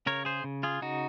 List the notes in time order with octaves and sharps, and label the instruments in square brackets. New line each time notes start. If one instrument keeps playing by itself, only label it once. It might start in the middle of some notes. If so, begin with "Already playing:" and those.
[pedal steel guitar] C#3 A#4 C#5
G#4 C5
C#3
F4 G#4
C#3 D#4 F#4